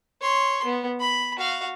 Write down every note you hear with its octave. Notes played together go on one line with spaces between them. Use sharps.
C#5 C6
B3
B5
F#4 F5